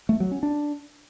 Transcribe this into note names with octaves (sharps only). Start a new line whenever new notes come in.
A3
F#3
C#4
D4